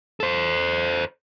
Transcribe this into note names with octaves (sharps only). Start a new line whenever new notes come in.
A4 C5